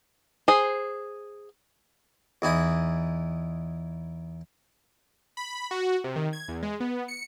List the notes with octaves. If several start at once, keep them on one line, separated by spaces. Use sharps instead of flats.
G#4 C5
E2 D#4 E4
B5
F#4
C3
D#3
G#6
E2
G#3
B3
C#7